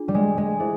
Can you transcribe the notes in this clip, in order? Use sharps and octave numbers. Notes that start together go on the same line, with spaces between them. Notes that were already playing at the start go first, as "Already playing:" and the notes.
Already playing: D4 F4 G#4
G3
G#3
G#3
E4 G#4 C5 E5